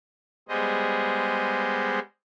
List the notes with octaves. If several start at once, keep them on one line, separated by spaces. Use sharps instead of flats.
G3 G#3 B3 G#4 C5 D#5